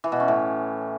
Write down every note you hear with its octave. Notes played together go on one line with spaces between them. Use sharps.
E3
B2
C#4
A2